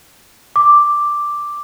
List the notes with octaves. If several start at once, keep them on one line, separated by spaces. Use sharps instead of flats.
D6